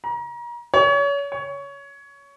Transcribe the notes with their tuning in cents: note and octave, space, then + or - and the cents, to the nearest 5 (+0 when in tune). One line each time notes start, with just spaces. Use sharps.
A#5 +35
C#5 +30
C#5 +15